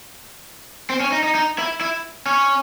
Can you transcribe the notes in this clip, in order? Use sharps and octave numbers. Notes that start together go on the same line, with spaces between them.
C4
C#4
D#4
D#4
D#4
E4
E4
C#4